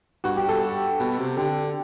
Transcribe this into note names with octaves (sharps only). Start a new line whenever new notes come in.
G2 F#4
G4
A4
B2
C3
D3 G4